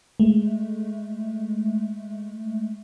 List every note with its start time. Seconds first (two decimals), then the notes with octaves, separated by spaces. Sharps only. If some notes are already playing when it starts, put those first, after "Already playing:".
0.20 G#3 A3